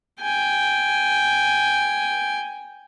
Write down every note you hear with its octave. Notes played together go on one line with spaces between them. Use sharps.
G5 G#5